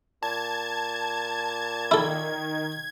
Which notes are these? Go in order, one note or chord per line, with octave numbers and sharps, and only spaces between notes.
A#2 A5 G#6
D#3 E4 A4